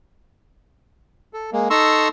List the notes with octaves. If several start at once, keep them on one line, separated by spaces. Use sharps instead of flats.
A4
G#3 A#3
D#4 A4 A#5 C6 C#6 E6